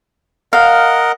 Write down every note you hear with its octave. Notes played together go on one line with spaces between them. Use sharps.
A#4 D#5 F5 F#5